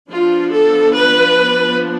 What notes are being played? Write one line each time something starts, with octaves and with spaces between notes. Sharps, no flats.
F3 B3 D4 F4
A4
B4